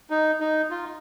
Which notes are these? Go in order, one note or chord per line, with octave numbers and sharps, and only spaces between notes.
D#4
D#4
F4